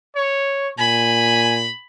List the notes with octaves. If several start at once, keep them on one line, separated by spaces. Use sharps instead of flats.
C#5
A#2 G#5 B5